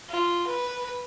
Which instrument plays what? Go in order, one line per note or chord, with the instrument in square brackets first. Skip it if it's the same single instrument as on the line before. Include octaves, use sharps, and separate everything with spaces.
[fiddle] F4
B4